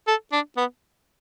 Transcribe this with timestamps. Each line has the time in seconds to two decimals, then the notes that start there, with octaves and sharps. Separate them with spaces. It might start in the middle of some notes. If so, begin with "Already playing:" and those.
0.07 A4
0.32 D4
0.57 B3